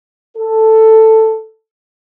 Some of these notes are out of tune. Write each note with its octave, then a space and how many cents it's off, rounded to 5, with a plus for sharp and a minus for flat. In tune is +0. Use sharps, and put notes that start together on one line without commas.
A4 +5